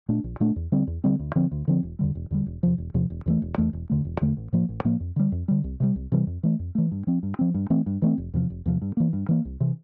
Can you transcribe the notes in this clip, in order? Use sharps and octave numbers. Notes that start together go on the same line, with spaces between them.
A#2 A3 D4
A#1
A#2 A3 D4
E2
D3 G3 C4
E2
D3 G3 C4
D2
D3 F3 C4
D2
D3 F3 C4
E1
E2 D3 G3
E1
E2 D3 G3
E1
E2 C3 F3
E1
E2 C3 F3
E1
E2 E3 A3
E1
E2 E3 A3
E1
E2 D3 A3
E1
E2 D3 A3
A1
A2 F3 A#3
A1
A2 F3 A#3
F2
D3 G3
F2
D3 G3
C2
C3 E3 G3
C2
C3 E3 G3
F2
E3 A3
F2
E3 A3
G2
F3 C4
G2
F3 C4
G2
E3 A3 C4
G2
E3 A3 C4
F1
E2 C3 F3
F1
E2 C3 F3
G2
E3 A#3
G2
E3 A#3
C2
C3 E3